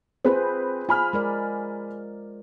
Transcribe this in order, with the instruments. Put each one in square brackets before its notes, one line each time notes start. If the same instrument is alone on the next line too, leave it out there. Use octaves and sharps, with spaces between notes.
[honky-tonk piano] C4 B4 [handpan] F4 G#4 C5
[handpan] F4 [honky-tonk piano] G#5 B5 F6
[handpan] G#3 A#4 D5